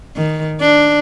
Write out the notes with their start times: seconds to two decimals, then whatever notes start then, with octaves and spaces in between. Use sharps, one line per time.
0.16 D#3
0.61 D4